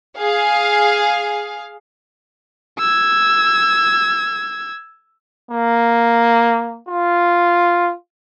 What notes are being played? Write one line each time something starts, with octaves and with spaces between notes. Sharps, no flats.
G#4 F5
E6 G#6
A#3
F4